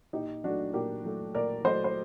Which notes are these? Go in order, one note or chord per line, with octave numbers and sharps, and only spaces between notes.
A#2 D#4 G4
F#3 A3 D4 F#4
A#2 G4 A#4
F#3 A3
A#2 A#4 D5
F#3 A3 C5 D#5
C5